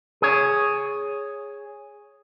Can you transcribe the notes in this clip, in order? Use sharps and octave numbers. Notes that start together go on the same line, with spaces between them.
G#4 C#5